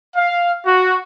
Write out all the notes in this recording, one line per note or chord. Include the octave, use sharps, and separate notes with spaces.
F5
F#4